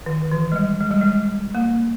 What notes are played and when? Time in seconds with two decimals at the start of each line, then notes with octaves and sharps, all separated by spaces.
0.06 D#3
0.32 E3
0.52 G#3
0.56 G3
0.80 G#3
0.91 G3
1.01 G#3
1.55 A#3